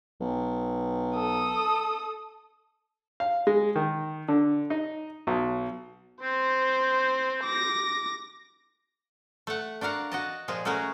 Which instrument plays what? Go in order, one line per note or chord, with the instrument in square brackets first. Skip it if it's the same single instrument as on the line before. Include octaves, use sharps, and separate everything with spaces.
[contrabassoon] B1
[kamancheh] A4 D#6
[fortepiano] F5
G#3
D#3
D3
D#4
B1
[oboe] C4 [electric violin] C5
[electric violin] D6 A#6
[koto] A3 F#5
D4 F#4 A#4 F5 F#5
F#4 D#5 A5
A#2 F3 G#3 G#4
A3 C#4 F#4 G#4 A#4